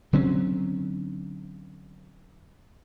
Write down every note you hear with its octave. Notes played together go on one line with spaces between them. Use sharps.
D3 F#3 C4 C#4